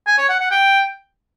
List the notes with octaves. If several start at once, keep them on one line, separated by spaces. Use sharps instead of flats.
G#5
C#5
F#5
F#5
G5